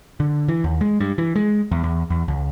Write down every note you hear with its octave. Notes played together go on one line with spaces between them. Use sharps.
D3
E3
D#2
G#3
G2
E3
G#3
E2
E2
E2
C#2